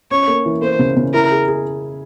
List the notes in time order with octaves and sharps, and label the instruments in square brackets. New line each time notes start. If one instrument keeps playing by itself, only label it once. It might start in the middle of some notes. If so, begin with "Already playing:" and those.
[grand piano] C#4 [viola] C#5
[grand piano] A#3
E3
[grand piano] A#3 [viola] C5
[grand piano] C#3
C#3
[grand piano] E4 [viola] A#4
[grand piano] G#4
G#4